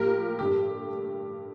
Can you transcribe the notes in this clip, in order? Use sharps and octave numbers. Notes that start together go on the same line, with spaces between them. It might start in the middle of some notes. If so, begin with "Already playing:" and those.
Already playing: A2 F3 A#3 G4 A#4
G2 D3 A3 G4